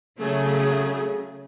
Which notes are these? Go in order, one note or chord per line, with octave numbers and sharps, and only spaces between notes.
C#3 F#3 A3 G#4